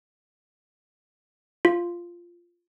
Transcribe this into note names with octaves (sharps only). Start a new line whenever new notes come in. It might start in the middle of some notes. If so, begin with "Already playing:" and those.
F4